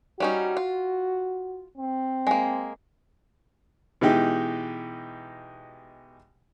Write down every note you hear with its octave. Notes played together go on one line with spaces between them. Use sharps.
G3 C#4 D#4 F#4
F4
C4
G#3 A#3
B2 E3 G#3 D#4 G4